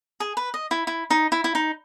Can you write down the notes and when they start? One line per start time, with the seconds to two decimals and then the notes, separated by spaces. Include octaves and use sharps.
0.20 G#4
0.37 B4
0.54 D#5
0.71 E4
0.87 E4
1.10 D#4
1.32 E4
1.44 E4
1.55 D#4